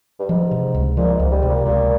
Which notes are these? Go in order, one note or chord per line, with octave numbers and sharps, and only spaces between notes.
G2
G#2 F3
C3
C#2
A#2 F3
G#2
C#2
G3
C3
A#2
C#2 A#2